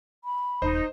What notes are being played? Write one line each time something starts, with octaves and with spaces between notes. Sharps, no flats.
B5
D#1 D#4 C5 D#5